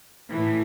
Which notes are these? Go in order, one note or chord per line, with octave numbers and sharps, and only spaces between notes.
A2 E3 A3